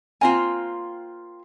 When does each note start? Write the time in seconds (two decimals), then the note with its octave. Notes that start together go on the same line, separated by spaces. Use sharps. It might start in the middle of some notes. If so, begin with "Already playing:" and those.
0.21 A#3 C4 F4 G#5